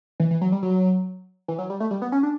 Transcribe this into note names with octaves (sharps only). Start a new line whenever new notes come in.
E3
E3
F#3
G3
F#3
E3
F#3
G3
A3
G3
B3
C#4
D4